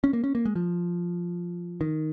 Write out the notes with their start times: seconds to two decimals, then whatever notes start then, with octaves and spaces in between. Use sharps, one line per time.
0.04 C#4
0.13 A#3
0.24 C#4
0.35 A#3
0.45 G#3
0.56 F3
1.81 D#3